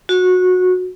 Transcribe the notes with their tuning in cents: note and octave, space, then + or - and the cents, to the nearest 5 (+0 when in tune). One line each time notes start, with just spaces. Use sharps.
F#4 -20